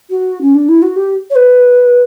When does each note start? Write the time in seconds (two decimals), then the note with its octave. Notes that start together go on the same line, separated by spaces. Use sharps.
0.10 F#4
0.41 C#4
0.55 D4
0.69 E4
0.82 F#4
0.96 G4
1.30 C#5
1.35 B4